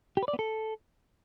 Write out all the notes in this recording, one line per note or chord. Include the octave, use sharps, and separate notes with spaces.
G4
B4
D5
B3
A4